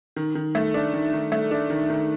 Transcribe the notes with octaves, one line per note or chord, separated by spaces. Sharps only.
D#3
D#3
A3
D4
D#3
D#3
A3
D4
D#3
D#3